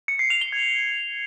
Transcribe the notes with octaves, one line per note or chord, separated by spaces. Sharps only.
C#7
C7
F7
G7
G#6